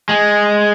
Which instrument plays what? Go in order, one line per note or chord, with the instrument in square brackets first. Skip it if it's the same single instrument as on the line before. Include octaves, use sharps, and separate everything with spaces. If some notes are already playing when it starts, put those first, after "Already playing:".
[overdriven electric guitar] G#3